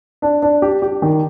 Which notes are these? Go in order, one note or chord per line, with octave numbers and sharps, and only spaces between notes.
D4
D4
G4
G4
D#3